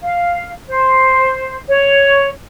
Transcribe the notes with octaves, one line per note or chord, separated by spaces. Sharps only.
F5
C5
C#5